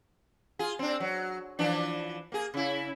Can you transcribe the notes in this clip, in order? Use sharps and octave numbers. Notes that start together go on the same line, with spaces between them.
F4 G#4
C4 D4
F#3
E3 F3 D4
A#3 G#4
C#3 E4